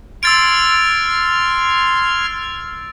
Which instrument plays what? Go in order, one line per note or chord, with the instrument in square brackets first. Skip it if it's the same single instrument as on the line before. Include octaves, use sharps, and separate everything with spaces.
[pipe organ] C6 F6 G#6 [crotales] E6 A6 D7